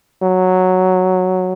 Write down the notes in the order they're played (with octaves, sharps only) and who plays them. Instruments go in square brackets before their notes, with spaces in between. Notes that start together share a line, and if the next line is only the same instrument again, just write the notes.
[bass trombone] F#3